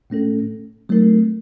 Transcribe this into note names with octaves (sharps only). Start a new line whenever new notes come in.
A2 A3 C#4 A4
F#3 A3 C4 D#4 A#4